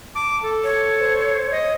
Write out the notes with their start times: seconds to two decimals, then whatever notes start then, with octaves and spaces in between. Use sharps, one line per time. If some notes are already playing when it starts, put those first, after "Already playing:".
0.15 A5 D6
0.43 A4
0.64 C#5
0.99 C5
1.52 D#5